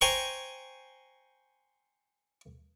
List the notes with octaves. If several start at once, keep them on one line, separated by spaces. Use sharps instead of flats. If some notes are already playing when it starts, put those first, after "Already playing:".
C5 G5 G#5 A#5 C#6